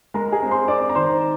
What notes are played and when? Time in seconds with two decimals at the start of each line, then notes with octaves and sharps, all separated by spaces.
0.14 G#3 A#4 A#5
0.32 G#4 G#5
0.42 C4
0.51 C5 C6
0.68 C4 D5 D6
0.89 A#5
0.95 D#3 C5 C6